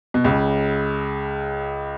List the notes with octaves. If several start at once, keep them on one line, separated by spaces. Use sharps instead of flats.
B2
C#2 C#3